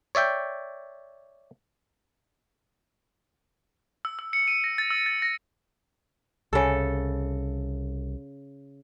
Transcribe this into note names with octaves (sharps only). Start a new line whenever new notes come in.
C#5 D5 E5 G5
E6
E6
C#7
D#7
A#6
A6
E6
A6
A#6
C2 C#3 A4